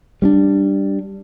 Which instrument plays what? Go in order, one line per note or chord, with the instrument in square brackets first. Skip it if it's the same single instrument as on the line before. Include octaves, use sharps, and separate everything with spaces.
[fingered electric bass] G3 C#4 D4